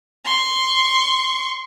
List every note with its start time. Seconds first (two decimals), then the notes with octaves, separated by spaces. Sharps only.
0.25 C6 C#6